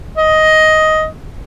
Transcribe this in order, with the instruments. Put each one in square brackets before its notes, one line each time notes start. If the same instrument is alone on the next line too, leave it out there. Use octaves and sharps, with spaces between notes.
[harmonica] D#5